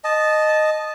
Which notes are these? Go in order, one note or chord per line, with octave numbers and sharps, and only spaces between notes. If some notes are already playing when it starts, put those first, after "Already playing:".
D#5 A5